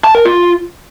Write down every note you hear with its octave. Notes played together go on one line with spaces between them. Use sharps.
A5
A#4
F4